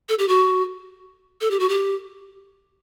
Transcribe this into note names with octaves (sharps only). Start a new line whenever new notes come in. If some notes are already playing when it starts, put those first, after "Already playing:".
A4
G4
F#4
A4
G4
F#4
G4